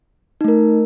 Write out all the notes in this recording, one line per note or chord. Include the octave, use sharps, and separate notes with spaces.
A3 D#4 A#4